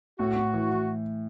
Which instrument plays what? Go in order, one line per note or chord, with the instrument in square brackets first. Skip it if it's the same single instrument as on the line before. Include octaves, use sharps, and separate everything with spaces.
[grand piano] A2 [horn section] F#4
[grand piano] A2
E3
E3